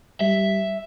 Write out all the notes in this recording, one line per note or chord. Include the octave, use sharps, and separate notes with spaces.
G3 E5